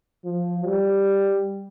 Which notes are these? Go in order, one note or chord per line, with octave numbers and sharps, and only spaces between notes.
F3
G3